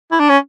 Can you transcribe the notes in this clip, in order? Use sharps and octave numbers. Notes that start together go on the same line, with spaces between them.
E4
D4
C#4